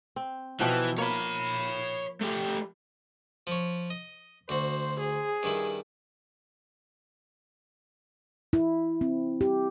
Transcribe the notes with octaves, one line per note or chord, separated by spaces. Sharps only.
C4
B2 E3 F3 G5
A#3 C#5 B5
A3 G4
F3 C#5
D#5
D2 F#4 C5
G#4
G2 D#3 E4
E4
C4
G4